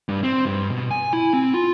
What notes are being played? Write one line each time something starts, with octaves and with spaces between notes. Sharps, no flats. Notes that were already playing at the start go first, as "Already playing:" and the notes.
G2
C4
G2
B2
G#5
E4
C4
F4